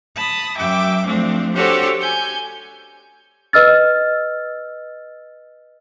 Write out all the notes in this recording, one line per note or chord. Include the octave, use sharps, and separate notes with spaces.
A5 B5 D#6
F#2 F#3 E5 G5 D6
F3 A3 C4 D4
D4 F#4 G4 A4 C5 C#5
G#5 G6
B4 D#5 E6 F6 A6